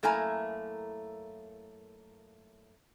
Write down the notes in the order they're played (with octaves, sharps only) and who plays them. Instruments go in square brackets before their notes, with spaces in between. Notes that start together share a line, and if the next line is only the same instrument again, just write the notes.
[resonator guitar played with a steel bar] F#2 A3 A#3 E4 G#5 A#5